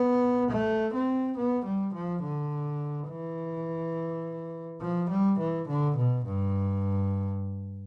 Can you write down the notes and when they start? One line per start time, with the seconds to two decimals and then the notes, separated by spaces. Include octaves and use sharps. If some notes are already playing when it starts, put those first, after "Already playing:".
Already playing: B3
0.51 A3
0.94 C4
1.37 B3
1.65 G3
1.94 F3
2.22 D3
3.09 E3
4.81 F3
5.09 G3
5.39 E3
5.68 D3
5.97 B2
6.25 G2